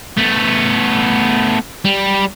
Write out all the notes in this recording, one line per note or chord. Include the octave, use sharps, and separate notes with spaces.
A3 B3
G3